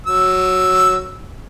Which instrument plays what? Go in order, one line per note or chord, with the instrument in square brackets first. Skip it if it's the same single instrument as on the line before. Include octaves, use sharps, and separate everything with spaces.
[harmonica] F#3 E6